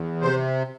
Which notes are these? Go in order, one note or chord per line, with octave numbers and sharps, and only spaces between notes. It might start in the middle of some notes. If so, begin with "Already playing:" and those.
Already playing: E2
C3 C5